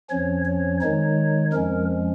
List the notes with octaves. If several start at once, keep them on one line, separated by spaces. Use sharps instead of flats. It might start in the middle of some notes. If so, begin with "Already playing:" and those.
F2 F3 C#4 C#5
C#5
D#3 G#3 D#4 C#5
F2 F3 G#3 C#4 A#4